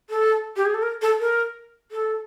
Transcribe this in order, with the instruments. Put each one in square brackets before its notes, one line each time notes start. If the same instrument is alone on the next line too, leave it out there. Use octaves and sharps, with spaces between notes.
[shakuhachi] A4
G4
G#4
A4
A#4
A4
A#4
A4